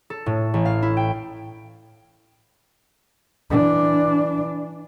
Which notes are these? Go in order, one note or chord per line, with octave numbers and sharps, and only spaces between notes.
A4
A2
A1
F5
E4
G5
E3 D4